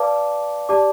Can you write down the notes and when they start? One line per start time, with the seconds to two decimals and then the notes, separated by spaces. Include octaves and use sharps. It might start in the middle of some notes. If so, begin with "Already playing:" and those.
Already playing: B4 D5 F5 A5 D6
0.69 G4 D5 A5 D6